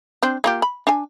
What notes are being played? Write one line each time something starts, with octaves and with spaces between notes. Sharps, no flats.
C4 D4 C5
A#3 F4 G4
B5
D4 G#5